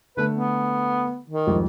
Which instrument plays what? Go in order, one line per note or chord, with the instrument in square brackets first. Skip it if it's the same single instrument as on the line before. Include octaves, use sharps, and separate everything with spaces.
[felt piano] D3 A3 [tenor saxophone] B4
[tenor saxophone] B3
D#3
[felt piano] C2 F2 G#2